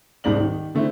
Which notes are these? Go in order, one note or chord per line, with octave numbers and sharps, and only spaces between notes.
D#1 C2 G#2 D5 F#7
D#3
D3 A3 C4 E4